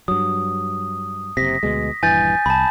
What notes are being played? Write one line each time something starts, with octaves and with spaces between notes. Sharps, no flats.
G2 F#3 D#6
F#1 C3 A#6 B6
D2 B2 G#3
D#1 G2 E3 G#5 G6 A6
C2 A5 B5